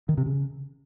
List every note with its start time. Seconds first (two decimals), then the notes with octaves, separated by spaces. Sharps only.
0.09 D#3
0.17 C3
0.26 C#3